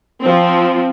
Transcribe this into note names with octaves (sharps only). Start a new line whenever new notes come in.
F3 C4